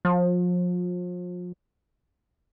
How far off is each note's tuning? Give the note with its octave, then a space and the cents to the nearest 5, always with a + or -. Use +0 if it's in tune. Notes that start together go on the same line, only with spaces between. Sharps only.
F3 +35